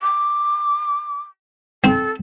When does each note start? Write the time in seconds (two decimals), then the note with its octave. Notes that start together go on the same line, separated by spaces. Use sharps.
0.01 D6
1.84 C4 A4